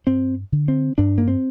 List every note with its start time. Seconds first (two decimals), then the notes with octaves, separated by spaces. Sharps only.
0.06 G2 C4
0.52 D3
0.68 C4
0.98 G2 D4
1.18 A#3
1.28 C4